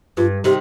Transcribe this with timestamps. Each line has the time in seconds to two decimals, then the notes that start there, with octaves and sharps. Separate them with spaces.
0.17 G2 F4
0.44 C3 D#3 G4